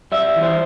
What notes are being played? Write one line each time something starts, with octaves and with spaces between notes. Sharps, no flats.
G3 E5
E3
C5